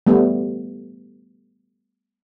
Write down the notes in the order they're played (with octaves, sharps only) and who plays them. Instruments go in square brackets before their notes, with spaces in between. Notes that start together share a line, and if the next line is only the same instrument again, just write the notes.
[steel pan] G3 A3 B3